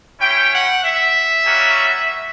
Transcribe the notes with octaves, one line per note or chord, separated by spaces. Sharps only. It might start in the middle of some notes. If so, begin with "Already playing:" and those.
C#4 E4 G4 G5
F#5
E5
G3 A#3 C#4 F#4